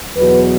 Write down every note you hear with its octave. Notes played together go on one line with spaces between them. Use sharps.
E2 B2 F#3 B4